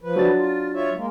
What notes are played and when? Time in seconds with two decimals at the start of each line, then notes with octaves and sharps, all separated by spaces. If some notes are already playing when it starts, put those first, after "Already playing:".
0.01 F3 B4
0.16 F#3 D4 A6
0.37 F4
0.74 F4 C#5 E5
0.95 G#3 A#3